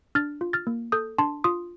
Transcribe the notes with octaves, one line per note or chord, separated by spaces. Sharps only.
D4 F6 A6
F4
F6 A6
A#3
A4 D#6 G6
D4 A5 C6
F4 C6 D#6